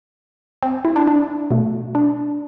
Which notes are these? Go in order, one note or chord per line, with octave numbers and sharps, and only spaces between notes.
C4
E4
D4
D4
B2 A3
D4